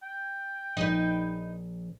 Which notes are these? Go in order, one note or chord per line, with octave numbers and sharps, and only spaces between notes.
G5
A#1 D#4 B4